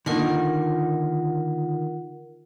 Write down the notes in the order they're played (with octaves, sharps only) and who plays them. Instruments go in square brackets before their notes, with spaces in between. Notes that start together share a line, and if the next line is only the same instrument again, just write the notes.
[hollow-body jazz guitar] D3 D#3 A#3 [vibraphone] F4 A#4 F#5